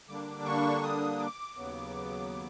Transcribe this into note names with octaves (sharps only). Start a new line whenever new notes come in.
D3 G3 A#3 D4 D6
C#6
D#6
D6
D#2 C#3 F#3 B3